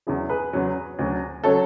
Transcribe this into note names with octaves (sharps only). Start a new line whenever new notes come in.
E2 C#3 F#3 E4 G#4
G#4 B4
E2 C#3 F#3
D2 C#3 F#3
C#3 F#3 A4 C#5